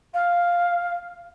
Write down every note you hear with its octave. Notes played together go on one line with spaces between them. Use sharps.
F5